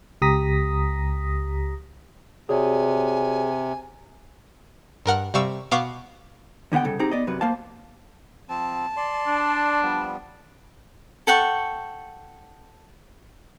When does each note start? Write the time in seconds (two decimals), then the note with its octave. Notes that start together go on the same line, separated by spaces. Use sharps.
0.22 C#2 G4 A#5 D#6 A#6 B6
2.49 C3 F#4 G#4 C#5 D5 G#5
5.06 G2 A#4 F#5 F6
5.34 C3 G3 F5 C#6 E6 C#7
5.71 B2 B3 F5 C#6 D6 C7
6.72 D#2 D3 B3 F#5 G5
6.84 C2 G2 C#3 A4
6.99 C4 D#4 G4 G#4 A#5
7.11 B3 D5 D#5
7.27 F#2 C3 F#3 B4
7.41 A#3 C5 F5 A5
8.49 F3 C4 A5
8.97 D5 C6
9.27 D4
9.83 F3 G3 B3
11.27 A4 F#5 G5 C#6